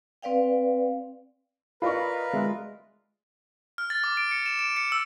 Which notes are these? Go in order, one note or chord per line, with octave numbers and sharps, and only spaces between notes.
C4 B4 D5 F5 G5
F4 A#4 B4 D5 D#5 B5 C#6
G#3 E5
F6
A6
D6
D7
C#7
E7
D7
C#7
E6